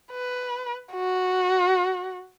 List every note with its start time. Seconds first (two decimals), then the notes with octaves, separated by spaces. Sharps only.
0.12 B4
0.93 F#4